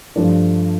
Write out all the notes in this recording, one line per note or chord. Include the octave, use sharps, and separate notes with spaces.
G2 F3 A3 D4